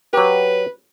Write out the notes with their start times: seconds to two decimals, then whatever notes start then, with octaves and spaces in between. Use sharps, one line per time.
0.13 F#3 G4 B4